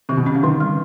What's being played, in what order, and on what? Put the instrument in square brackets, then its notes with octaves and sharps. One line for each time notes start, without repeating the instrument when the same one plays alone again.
[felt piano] C3 [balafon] D#3
[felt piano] B2
[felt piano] C3 [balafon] C#4
[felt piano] C#3
[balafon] D3 [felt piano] D#3
[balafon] G3